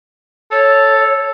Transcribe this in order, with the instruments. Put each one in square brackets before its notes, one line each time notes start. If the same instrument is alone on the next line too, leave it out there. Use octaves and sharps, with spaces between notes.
[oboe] A4 [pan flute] C#5